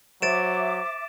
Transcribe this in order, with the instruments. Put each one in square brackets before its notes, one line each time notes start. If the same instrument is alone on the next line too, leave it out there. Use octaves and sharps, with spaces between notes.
[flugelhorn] F#3 [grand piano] C5 [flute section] E5 D6 [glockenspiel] A6 D7 E7